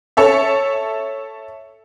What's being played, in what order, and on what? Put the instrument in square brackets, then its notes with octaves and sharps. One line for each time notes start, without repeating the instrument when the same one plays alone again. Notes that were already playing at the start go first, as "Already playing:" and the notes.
[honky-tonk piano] A4 C#5 E5